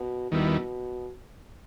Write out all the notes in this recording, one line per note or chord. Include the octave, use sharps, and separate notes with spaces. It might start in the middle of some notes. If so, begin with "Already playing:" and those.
Already playing: B2
D#2 B2 D#3 G3 B3 E4